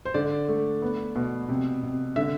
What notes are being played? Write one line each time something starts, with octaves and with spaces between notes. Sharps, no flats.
C5
D3 D5
A3
B3
B2
C3
C3
D3 E5